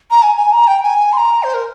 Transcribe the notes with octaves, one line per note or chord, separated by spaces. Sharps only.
A#5
G#5
G#5
A#5
G5
G#5
C6
A#5
C5
A#4